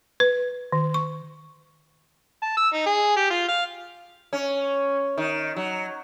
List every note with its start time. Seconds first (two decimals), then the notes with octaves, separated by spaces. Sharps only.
0.20 B4
0.72 D#3
0.94 C#6
2.42 A5
2.57 E6
2.73 D#4
2.86 G#4
3.16 G4
3.30 F4
3.48 F5
4.33 C#4
5.18 D#3
5.56 F#3